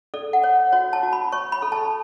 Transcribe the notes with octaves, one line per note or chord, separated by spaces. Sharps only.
A4 D5
F#5
C#5
F#4 C#5
A5
F#4
B5
C#5 C#6
B5
A4
A5